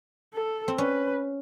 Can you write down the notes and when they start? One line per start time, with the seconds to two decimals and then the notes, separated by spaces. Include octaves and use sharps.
0.34 A4
0.68 C4
0.78 C#4 B4